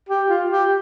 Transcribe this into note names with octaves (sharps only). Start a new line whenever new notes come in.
G4
F4
G4